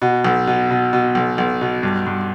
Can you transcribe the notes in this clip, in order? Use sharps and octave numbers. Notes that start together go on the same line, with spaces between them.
B2
B1
B2
B2
B2
B1
B1
B2
G2
G2